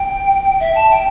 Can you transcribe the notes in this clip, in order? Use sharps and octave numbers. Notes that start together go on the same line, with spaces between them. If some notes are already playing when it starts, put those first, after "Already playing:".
Already playing: G5
E5
A5
G5